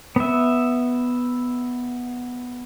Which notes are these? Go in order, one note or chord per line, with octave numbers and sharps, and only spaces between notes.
B3 E5